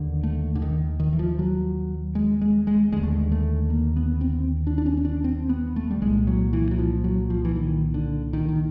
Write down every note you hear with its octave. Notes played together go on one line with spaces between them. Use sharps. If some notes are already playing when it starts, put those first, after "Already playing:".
Already playing: D#2 D3
A3
D3
D#3
D#3
E3
F3
F#3
G#3
G#3
G#3
D#2 D3 G#3
A3
G#3
A3
A#3
B3
C4
D4
D4
C#4
C#4
D4
C4
B3
A3
G3
C2 A#2 G#3
F#3
E3
F#3
F3
F#3
F3
E3
D#3
D3
D#3
D#3